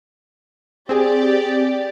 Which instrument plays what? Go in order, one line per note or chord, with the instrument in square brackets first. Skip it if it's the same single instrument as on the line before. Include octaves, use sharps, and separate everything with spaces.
[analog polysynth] C4 G#4 [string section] G4 D5